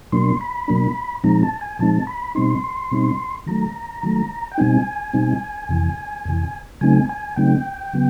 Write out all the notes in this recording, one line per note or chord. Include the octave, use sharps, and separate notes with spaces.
B2 F#3 A#3 D4 C6
B5
B2 F#3 A#3 D4
A#2 F3 G#3 C4 D#4 A#5
A5
G#5
A#2 F3 G#3 C4 D#4 A5
B5
B2 G3 C4 D#4 C6
B2 G3 C4 D#4
D#3 F#3 A3 A#5
D#3 F#3 A3
G5
B2 G3 C4 D#4 G#5
B2 G3 C4 D#4
F2 C3 E3
F2 C3 E3
C#3 F#3 A3 C4 D#4 G#5
G#5
C#3 F#3 A3 C4 D#4 G5
C#3 F#3 B3